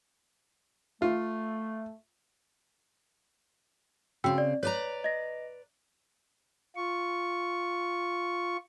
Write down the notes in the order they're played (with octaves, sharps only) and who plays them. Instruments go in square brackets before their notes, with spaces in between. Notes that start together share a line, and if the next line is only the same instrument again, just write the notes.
[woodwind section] A3 [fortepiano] F4
[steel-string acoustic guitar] C#3 C4 [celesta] F#4 G5 E6
[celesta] D5
[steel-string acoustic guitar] B4 D5 A#5 [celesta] C#5
[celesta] D#5 A#6
[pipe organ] F4 C#6